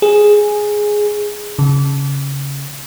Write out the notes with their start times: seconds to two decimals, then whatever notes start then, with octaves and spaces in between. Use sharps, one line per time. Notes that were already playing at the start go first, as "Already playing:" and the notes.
0.02 G#4
1.59 C#3